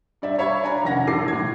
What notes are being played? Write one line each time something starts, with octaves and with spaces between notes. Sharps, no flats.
G2 D5 E5
C#5 E5 F5 B5 C#6 G#6
D4 D5 G#5 A#5
F1 D#3 C#4 F#5 A#6
A1 G2 A4 D6 C7
A2 G#6